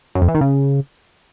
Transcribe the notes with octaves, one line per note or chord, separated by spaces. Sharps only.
F#2
F2
E3
D#3
C#3